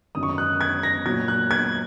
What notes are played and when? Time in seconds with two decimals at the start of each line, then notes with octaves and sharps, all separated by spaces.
0.15 F#2 D#3 F#3 D#6
0.23 C#6
0.29 D#6
0.38 F#6
0.61 G#6
0.83 A#6
1.06 A#2 F#3 G#6
1.28 F#6
1.51 G#6